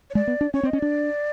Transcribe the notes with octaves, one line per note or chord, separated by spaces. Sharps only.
C#5
G#3 D5
B3
D4
C#4 C#5
C4
D#5
C#4
D4 D5